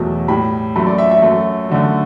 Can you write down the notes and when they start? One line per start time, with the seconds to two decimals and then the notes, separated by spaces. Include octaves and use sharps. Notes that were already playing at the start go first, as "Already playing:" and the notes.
Already playing: E2 B2 F#3 A3
0.28 A2 G3 B5
0.76 F#2 F#3 A3 B5
0.87 D5
0.98 E5
1.11 E5
1.22 F#2 F#3 A3
1.69 F#2 D3 A3